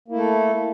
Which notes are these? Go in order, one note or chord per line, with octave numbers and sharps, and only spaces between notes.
A3 A#3 E4 A4